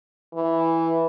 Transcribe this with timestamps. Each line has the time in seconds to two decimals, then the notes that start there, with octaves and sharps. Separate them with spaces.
0.34 E3